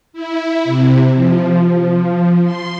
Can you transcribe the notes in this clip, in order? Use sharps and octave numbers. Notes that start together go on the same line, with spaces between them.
E4
C3
F3
C6